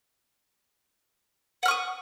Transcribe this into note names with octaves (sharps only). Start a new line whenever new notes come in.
F#5 C#6 D#6 F6